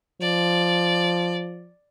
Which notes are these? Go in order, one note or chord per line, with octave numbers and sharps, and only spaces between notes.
F3 D5